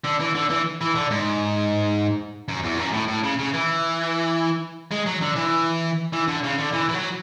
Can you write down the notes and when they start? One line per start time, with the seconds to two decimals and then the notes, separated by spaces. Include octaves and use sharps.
0.05 D3
0.20 E3
0.35 D3
0.50 E3
0.81 E3
0.95 D3
1.11 G#2
2.49 F#2
2.64 E2
2.78 F#2
2.93 A2
3.08 A2
3.23 C#3
3.39 C#3
3.54 E3
4.92 G#3
5.06 F#3
5.22 D3
5.37 E3
6.13 E3
6.28 D3
6.44 C#3
6.58 D3
6.73 E3
6.89 E3
6.94 F#3